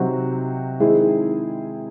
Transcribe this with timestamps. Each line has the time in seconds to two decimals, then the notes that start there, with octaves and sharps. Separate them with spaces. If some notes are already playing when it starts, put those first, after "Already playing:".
Already playing: C3 F#3 C4 D#4 F#4
0.80 D#3 G#3 C4 E4 G#4